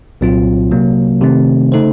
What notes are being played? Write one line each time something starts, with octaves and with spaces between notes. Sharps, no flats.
C2 A#2 F#3 C4 F4
C3 F#3 A#3
C3 D#3 A3 C4
C#3 A3 D#4 A4 C5